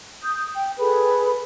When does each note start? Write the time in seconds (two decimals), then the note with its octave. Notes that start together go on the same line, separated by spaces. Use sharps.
0.23 D#6 G6
0.54 G5
0.78 G#4 A4 B4 B5